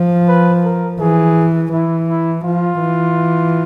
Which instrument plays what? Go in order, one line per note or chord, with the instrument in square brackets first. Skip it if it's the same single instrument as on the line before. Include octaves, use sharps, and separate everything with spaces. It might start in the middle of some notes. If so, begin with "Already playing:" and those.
Already playing: [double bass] F3
[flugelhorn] B4
A#4
[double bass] E3 [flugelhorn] G#4
[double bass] E3 [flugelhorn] E4
[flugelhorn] E4
[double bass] F3 [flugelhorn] F4
[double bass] E3